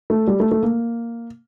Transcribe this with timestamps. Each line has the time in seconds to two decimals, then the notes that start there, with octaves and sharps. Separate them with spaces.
0.10 A3
0.27 G3
0.40 A3
0.51 A3
0.63 A#3